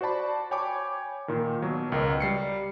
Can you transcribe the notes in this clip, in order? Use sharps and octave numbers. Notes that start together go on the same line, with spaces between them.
F#4 C5 D5 A5 B5
C#5 G5 G#5 B5 C#6 D6
A#2 D#3
B2 F#3
C#2 A#4 D#5
G3 C7 C#7